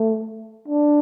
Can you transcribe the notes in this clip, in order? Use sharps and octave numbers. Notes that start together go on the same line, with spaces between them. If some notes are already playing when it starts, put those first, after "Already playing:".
Already playing: A3
D4